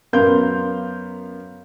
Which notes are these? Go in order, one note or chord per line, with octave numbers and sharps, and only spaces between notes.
F#2 B3 A#4 F5 C6 G6